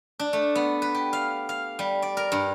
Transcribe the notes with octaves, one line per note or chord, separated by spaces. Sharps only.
D4
A3
B3
B4
G4
F5
F5
G3
D5
A#4
G2